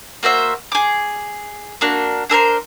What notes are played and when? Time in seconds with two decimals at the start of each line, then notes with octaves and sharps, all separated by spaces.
0.23 A#3 F#4 C5 E5
0.72 G#4 D6
1.81 A#3 D4 F#4
2.29 D4 A4 A#4 C5